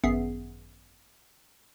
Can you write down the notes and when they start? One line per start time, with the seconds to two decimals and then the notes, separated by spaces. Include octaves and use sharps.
0.04 G#1 F#2 B3 G#4 E5 C7